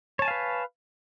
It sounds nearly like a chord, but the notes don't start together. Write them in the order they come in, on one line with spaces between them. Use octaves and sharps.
C#5 A5 G#5 F5 B4